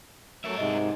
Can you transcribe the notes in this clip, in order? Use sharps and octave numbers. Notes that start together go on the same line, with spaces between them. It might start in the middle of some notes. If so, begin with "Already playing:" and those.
F#3 A3 A#4 E5
G#2 C3 G#3 D#4 D#5